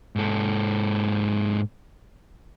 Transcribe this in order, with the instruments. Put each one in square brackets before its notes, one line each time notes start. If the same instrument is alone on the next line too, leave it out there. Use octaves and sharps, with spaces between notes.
[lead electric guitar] G#2 A4